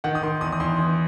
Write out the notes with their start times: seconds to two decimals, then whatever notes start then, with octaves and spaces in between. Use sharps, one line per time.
0.04 D#3 F#5
0.15 D#6
0.23 D#3 C6
0.41 E2 D#6
0.52 D#6
0.60 E2 C6
0.79 E3